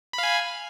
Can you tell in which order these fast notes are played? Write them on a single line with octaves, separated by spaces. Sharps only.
B5 F5 G#5